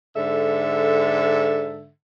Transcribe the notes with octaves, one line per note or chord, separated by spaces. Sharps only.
G#2 D3 A4 E5